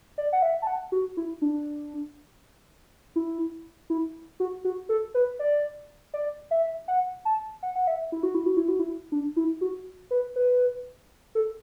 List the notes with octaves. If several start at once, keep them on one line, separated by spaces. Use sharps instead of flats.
D5
F#5
E5
A5
F#5
F#4
E4
D4
E4
E4
F#4
F#4
A4
B4
D5
D5
E5
F#5
A5
F#5
F#5
E5
E4
F#4
E4
F#4
E4
F#4
E4
D4
E4
F#4
B4
B4
A4